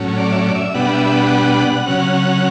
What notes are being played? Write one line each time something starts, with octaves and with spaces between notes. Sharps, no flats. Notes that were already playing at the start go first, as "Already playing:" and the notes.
Already playing: A2 F#3 C#4
D5
E5
D5
E5
B2 G3 B3 D4 F#5
E5
E5
F#5
C#3 F#3 C#4